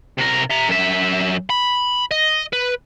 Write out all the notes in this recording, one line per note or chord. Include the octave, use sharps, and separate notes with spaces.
C3 A#4
E5 A#5
F#2 E5
B5
D#5
B4